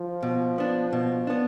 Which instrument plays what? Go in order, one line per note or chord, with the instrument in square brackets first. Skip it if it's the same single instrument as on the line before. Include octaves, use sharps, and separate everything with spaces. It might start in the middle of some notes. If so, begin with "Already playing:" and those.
Already playing: [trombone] F3
[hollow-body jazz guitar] B2
B3 D4
B2
B3 D4